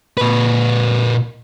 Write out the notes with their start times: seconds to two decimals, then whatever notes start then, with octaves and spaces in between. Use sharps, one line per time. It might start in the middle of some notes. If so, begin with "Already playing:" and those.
0.17 A#2 B4